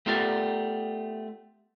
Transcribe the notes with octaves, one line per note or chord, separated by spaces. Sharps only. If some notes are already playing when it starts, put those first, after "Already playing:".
A3 B3 F4 G4 A#4 D5